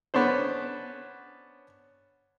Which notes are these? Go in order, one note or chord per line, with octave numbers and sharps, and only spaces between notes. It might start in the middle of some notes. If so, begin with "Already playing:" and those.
B3 C#4 D4 C5